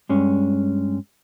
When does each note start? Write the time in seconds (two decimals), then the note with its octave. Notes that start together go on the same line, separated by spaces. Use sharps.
0.09 G2 G#3 C#4